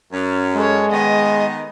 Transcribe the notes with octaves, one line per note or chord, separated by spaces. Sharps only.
F#2 C#4
G#3 A4 C#5
D#3 B3 D#5